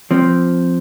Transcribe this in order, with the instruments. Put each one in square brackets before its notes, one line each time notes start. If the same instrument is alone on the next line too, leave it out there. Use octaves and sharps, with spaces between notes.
[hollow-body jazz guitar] F3 C4